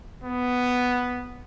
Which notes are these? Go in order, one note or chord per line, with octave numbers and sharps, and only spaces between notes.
B3